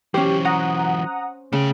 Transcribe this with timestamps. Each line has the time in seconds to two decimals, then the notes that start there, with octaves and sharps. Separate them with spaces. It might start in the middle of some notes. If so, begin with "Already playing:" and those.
0.14 E3 F#3 C#4 G4 C5
0.45 F#5 A#5 D#6
1.52 C#3 A3 G5